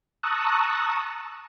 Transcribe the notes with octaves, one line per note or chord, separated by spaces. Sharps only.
A5 A#5 C#6 D#6 E6 F#6